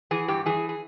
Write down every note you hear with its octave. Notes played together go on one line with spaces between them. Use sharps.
E3 G#4
G2 G4
E3 G#4
G#4